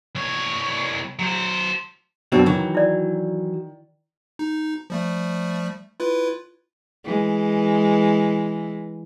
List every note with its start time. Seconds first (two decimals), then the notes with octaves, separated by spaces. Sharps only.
0.15 C2 C#5
1.19 F#3 C5
2.32 F#2 B2 C4 D4
2.46 D#3 E3 F#3
2.75 E4 D5
4.39 D#4
4.90 F3 G3 A3
6.00 E4 F4 B4
7.04 E3 G#3